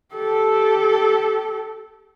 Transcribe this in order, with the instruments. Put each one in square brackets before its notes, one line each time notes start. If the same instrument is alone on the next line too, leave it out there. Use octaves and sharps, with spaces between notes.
[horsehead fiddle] G4 A4